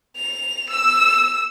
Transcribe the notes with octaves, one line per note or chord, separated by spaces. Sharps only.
F7
E6